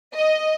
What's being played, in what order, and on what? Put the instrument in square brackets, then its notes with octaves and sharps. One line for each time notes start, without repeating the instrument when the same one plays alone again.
[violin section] D#5